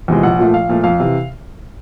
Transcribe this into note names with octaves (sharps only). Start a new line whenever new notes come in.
E2 C3 F3 G#3
A#1 F#5
A#2 F3 A3
A#1 F5
A#2 F3 A3
F2 F5
C3 E3